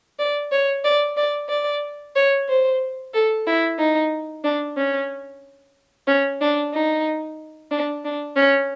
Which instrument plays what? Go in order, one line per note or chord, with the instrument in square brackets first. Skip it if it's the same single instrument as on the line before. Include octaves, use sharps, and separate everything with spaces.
[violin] D5
C#5
D5
D5
D5
C#5
C5
A4
E4
D#4
D4
C#4
C#4
D4
D#4
D4
D4
C#4